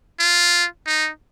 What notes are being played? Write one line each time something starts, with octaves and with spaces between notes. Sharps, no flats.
F4
D#4